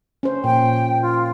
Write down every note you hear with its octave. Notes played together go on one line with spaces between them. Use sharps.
C#4 C5
A#2 G5
F4